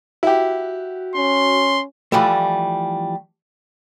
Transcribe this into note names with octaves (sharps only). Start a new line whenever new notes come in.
E4 F#4 G4
C#4 C6
E3 F3 G3 A3